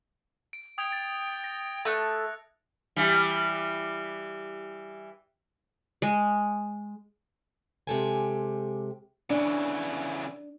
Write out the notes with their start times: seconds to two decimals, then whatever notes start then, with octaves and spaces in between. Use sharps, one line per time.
0.53 D7
0.78 G5 D#6 G#6 F7
0.92 A6
1.44 A#6
1.85 A3 F#6 A#6 C#7
2.96 E3 G3
6.02 G#3
7.87 C3 G#3 G4 A4 G5 G#5
9.30 C#3 E3 D4